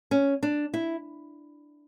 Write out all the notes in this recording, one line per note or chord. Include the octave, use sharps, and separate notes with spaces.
C#4
D4
E4